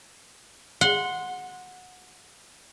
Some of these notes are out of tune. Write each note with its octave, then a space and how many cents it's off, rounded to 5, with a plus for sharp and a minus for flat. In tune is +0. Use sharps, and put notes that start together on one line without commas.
F#5 -20 C6 +0